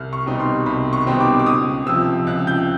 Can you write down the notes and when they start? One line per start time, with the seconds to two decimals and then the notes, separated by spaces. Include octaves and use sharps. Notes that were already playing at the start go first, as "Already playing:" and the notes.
Already playing: C2 F6
0.13 C#6
0.26 B2 G3 C4 D#4
0.40 C6
0.66 C2 B5
0.93 C#6
1.07 B2 G3 C4 D#4
1.20 D6
1.39 D6
1.46 C#2 D#6
1.86 C3 F3 E6
2.27 C#2 F#6
2.47 G6